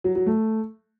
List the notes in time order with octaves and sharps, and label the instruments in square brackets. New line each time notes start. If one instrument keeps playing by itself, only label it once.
[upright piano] F#3
F#3
A3